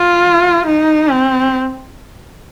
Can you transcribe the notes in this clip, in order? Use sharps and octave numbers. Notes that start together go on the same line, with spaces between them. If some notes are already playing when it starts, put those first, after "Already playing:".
Already playing: F4
D#4
C4